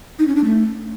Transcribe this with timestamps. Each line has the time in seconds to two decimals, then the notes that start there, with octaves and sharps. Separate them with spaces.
0.19 D#4
0.27 C#4
0.36 D4
0.44 A3